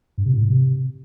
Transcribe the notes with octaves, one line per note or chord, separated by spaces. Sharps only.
G2
C3
A2
G#2
C3